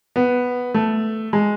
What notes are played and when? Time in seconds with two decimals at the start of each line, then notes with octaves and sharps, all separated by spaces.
0.16 B3
0.74 A3
1.33 G#3